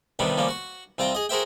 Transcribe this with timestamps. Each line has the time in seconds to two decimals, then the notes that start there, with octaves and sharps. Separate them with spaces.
0.19 C3 D#3 G3 B3 D4
0.37 F3 G3 A#3 C#4
0.49 F#4 C#6
0.98 C2 C4 F4 G5 A#5
1.15 G#4 D#5
1.29 F#4 G#4 A#4 C5 E5 G5